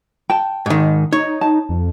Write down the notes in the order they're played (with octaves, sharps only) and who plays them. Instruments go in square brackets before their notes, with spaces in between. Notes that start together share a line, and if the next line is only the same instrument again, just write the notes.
[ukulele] G5 A5
[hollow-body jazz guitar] G#2 D#3
[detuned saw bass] D#4 [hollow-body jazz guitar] C#5
[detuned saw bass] D#4 [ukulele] A5
[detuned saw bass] F2